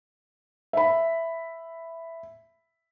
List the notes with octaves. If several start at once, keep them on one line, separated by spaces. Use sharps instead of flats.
E5 B5